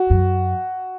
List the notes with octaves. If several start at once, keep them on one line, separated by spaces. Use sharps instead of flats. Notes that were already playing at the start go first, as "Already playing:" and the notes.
Already playing: F#4
F#2